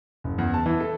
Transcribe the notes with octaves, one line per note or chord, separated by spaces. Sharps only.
F#1
E2
A5
E3
A4